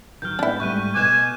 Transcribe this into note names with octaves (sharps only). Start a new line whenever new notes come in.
D#3 F#3 A#4 F6 G6
G#2 B3 C4 D4 E4 G6
G#2 G3 A3 C#6 F#6 D#7
B2 C5 D#5 G#5 D6 F#6 E7